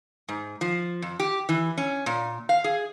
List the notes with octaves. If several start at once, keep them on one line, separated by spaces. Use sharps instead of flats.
G#2
F3
F2
G4
E3
C#4
A#2
F5
G#4